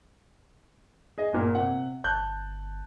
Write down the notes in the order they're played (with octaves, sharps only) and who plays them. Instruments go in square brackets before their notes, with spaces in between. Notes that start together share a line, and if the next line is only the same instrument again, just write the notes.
[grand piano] G#4 D#5
G1 A#2 A#3
C3 F#5
[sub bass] G1 [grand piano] A5 F#6 G6